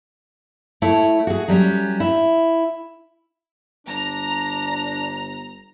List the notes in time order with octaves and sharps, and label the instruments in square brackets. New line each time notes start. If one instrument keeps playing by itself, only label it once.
[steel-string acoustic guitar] A3 E4 C#5
F#4 G#4
F#3 G3 C#4
E4
[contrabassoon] G1 [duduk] D4 [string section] A#5